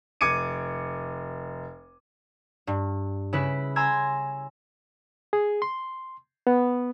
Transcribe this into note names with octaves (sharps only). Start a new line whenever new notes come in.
F1 D6 G#6 C#7 D#7
G2
C#3 E4 B4
G#5 A#5 C6 E6 G#6 A#6
G#4
C6
B3